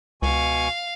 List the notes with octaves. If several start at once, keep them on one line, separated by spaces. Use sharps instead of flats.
C#2 B2 F5 G#5 C#6